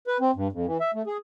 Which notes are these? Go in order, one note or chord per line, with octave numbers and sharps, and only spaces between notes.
B4
C4
G2
F2
E3
E5
A3
G#4